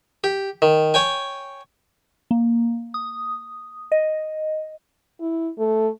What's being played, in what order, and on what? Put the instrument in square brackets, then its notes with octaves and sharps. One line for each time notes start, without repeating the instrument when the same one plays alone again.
[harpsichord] G4
D#3
C#5 G5 G#5
[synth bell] A#3
D#6
D#5
[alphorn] E4
A3